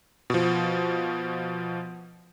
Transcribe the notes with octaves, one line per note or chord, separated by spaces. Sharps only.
B2 F3